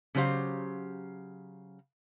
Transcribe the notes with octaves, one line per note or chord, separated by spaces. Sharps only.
C#3 F#3 G4 C5 F5